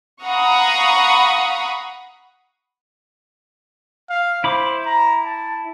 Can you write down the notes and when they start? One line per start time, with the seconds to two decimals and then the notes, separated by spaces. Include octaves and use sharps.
0.24 F5 F#5 A#5 B5 C#6 D#6
4.10 F5
4.44 E4 C5 B5 D6
4.86 A#5
5.25 A5